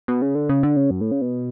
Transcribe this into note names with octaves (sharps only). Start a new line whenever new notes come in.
B2
C#3
D3
C#3
D3
C#3
F#2
A2
C#3
B2